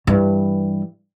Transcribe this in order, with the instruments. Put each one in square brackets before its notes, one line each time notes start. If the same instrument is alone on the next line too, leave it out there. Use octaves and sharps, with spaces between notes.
[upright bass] G2 E3